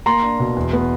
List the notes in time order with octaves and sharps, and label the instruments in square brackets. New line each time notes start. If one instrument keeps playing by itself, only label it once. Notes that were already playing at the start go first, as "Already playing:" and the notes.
[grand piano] A#3 A#5 C6
D4
B2
E2
B3